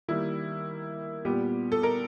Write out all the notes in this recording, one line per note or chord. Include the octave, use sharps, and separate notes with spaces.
D#3 G3 A#3 E4
A#2 G3 B3 G4
A4
A#4